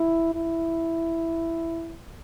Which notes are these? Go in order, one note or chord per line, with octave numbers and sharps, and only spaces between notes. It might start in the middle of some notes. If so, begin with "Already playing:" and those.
Already playing: E4
E4